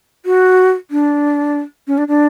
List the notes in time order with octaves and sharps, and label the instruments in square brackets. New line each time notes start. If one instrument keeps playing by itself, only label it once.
[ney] F#4
D4
C#4
D4
D4